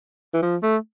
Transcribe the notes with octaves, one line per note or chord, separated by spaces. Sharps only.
E3
F3
A3